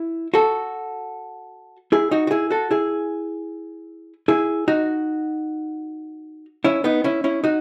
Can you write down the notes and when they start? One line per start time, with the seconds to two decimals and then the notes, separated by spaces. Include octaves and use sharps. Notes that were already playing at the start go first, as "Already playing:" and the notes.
Already playing: E4
0.34 F#4 A4
1.92 E4 G#4
2.11 D#4 F#4
2.27 F#4
2.31 E4 G#4
2.51 F#4 A4
2.71 E4 G#4
4.28 E4 G#4
4.68 D#4 F#4
6.64 C#4 E4
6.84 B3 D#4
7.04 C#4 E4
7.24 C#4 E4
7.44 D#4 F#4